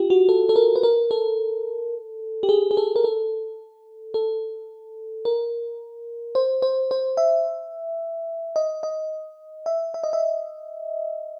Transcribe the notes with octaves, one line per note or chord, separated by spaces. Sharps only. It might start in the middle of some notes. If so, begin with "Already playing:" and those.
Already playing: F4 G4
F#4
A4
A4
A#4
B4
A#4
A4
G4
G#4
G#4
A4
A#4
A4
A4
A#4
C5
C5
C5
E5
D#5
D#5
E5
E5
D#5
E5